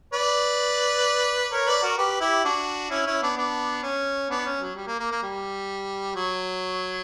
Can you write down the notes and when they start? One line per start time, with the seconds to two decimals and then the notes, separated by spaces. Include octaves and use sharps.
0.13 B4 D5
1.52 A#4 C#5
1.67 B4 D5
1.82 F#4 A#4
1.98 G4 B4
2.21 E4 G4
2.44 D4 F#4
2.91 C#4 E4
3.06 C#4 E4
3.22 B3 D4
3.37 B3 D4
3.83 C#4
4.30 B3 D4
4.45 C#4
4.60 F#3
4.76 G3
4.87 A#3
5.00 A#3
5.11 A#3
5.23 G3
6.15 F#3